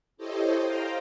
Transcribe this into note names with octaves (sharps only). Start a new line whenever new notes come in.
E4 G4 A4 C5 C#5 D#5
C5 D#5 F5 G5 A#5